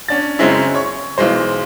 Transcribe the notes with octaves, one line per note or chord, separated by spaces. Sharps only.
C#4 D4 A6
F#2 C#3 G#3 C4 C#4 E4
C#5 C#6
B1 E3 G#3 C5